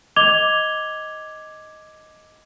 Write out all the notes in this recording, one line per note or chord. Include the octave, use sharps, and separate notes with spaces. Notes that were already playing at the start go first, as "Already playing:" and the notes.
D#5 D6 G#6 F7 G7